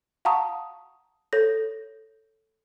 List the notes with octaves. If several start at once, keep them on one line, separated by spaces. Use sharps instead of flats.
F5 F#5 A5 A#5 C#6 D#6
A4 C#5 G6 A#6